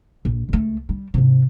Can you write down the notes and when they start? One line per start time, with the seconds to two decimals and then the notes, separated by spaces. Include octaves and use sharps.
0.25 A#1
0.49 C#2 A3
0.89 G3
1.14 G#2 C3